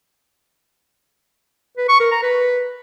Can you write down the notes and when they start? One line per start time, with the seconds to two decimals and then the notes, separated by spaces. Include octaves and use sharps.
1.78 B4
1.89 C#6
2.00 A#4
2.11 A#5
2.23 B4